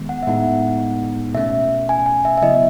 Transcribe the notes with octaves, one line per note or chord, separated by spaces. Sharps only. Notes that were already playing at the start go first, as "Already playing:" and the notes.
Already playing: D#3 G#3 B3
F#5
E5
A2 G#3 B3 D#4 F#5
B2 A3 C#4 E5
G#5
G#5
E5
E5
C#3 F#3 B3 E4 D#5
D#5